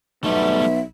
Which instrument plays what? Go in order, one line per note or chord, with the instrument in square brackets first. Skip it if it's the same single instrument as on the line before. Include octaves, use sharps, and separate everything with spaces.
[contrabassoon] B1 [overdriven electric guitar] G3 A3 [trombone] B3 [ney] E5